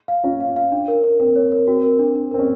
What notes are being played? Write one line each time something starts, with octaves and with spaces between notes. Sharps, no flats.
F5
C#4 F4
F5
F5
D4
A#4
A#4
C4 A#4
C#5
A#4
C4 F#4
A#4
D4
D4
C4 A#4
C#4